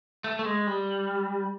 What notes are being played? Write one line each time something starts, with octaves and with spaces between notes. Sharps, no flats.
A3
A3
G#3
G3